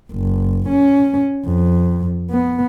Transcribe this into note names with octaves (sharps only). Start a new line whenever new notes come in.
F#1
C#4
F2
B3